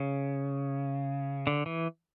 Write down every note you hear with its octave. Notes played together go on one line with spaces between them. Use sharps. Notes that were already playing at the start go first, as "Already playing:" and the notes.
Already playing: C#3
D3
E3